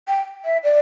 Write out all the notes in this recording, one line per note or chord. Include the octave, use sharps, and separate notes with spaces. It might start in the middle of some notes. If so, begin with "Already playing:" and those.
G5
E5
D5